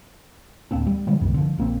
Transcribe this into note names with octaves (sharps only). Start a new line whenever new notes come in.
D1 A#3 C4 D4
G3
D3 F3 G#3
C2 F#2 D#3 B3
D3 F3
A#1 A#3 C4